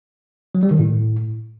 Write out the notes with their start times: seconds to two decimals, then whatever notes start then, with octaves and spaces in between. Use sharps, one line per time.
0.55 F#3
0.63 G3
0.71 D#3
0.79 A2